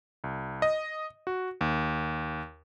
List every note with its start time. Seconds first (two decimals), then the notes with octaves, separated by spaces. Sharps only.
0.24 C2
0.62 D#5
1.27 F#4
1.61 D#2